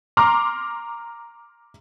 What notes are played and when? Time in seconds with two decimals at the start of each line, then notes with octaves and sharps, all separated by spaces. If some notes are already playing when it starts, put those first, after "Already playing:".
0.17 A#5 C6 D6 F6